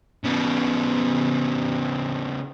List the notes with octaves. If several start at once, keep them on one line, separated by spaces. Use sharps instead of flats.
C#3 B3